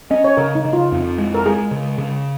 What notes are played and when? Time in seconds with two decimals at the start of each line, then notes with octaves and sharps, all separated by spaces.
0.11 C#4 D#5
0.24 C#5
0.37 C#3 A#4
0.55 D#4
0.65 C#3
0.73 F4
0.92 F2
1.18 G#3
1.34 A#4
1.46 G#3 G#4
1.71 C#3
1.98 C#3